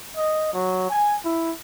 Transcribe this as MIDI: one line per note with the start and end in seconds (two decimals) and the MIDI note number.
0.17 0.53 75
0.53 0.88 54
0.90 1.15 80
1.25 1.51 64